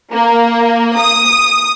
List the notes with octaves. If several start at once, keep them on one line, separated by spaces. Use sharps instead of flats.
A#3
D#6